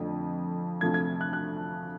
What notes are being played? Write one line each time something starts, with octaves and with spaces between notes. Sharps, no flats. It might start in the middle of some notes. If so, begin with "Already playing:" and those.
Already playing: F2 D3 F3 A3
D2 C3 F3 A3 G#6
G#6
F#6
F#6